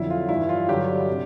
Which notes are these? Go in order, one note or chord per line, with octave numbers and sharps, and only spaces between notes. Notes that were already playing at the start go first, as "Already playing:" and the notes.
Already playing: F2 D3 F#3 E4
F4
G2 E3 E4
F4
G2 D3 F#3 G4
C3